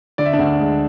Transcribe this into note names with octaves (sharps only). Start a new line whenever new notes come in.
D3 D5
E5
D4 D5
D2
G#3